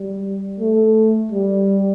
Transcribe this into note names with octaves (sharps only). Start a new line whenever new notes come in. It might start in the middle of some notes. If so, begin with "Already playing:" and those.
Already playing: G3
A3
G3